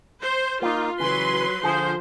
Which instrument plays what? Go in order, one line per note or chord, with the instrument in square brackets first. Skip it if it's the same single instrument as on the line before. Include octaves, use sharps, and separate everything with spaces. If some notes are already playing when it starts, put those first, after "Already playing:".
[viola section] C5
[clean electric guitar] A#3 D#4 [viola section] F4
[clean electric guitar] C#3 E3 [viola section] F#3 B4 C6
[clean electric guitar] D3 G#4 [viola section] F3 C5